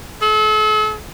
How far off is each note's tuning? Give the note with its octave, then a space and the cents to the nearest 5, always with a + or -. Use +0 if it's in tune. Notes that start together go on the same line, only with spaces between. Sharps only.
A4 -40